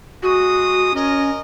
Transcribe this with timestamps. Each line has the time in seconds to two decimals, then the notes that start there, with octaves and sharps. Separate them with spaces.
0.23 G#3 F#4 D#6
0.94 C#4 A#4 D#5